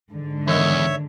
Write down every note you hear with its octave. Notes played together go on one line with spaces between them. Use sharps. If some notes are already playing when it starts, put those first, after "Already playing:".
G#2 D3
E2 D#3 A#4 C#5 D#5 E5